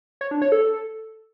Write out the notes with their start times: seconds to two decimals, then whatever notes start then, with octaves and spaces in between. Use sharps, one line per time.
0.21 C#5
0.31 D4
0.42 C#5
0.52 A4